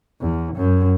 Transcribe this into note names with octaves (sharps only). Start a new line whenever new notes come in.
E2
F#2